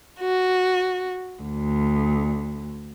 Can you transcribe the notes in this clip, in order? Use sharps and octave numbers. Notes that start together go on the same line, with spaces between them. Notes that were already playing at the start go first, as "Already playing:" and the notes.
F#4
D2